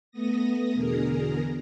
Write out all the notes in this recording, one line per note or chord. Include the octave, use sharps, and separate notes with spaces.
A3 B3 D#6 A#6
E2 B2 D3 G#4 A#4 A#5